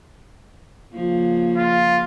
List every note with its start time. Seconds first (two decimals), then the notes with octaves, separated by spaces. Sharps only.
0.94 C#3 F3 A#3
1.57 F4